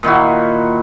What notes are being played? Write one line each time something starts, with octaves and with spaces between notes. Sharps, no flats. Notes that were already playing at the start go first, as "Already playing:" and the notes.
A#2 D#3 E4 F#4